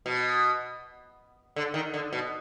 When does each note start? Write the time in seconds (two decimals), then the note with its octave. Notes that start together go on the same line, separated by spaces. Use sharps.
0.06 B2
1.56 D3
1.74 D#3
1.94 D3
2.13 B2